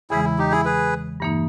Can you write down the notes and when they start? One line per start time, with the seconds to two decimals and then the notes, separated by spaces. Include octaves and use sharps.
0.10 E2 C#3 E3 G#3 E4 G#4
0.25 E4
0.38 D#4 G4
0.51 E4 G#4
0.65 G#4 B4
1.20 G2 E3 A#3 D#4